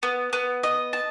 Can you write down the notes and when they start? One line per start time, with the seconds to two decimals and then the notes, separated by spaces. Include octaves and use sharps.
0.03 B3
0.33 B3
0.64 D#5
0.93 A5